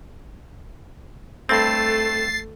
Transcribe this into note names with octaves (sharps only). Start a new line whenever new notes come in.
G2 A3 C4 A4 A6 C7